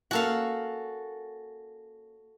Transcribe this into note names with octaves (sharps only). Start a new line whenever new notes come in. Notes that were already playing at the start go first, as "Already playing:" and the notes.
A#3 C#4 F#4 A4 F5